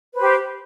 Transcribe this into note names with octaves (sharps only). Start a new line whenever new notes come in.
G4 B4 C5